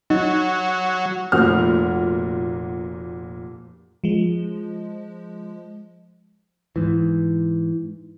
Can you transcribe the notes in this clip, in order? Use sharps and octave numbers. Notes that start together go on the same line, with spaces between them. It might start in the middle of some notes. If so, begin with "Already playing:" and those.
F#3 D#4
F1 A#2 A#3 F#4 F6
F3 G#3
G#2 E3